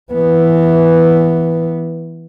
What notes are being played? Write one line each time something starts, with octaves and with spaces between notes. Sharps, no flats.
E3 B3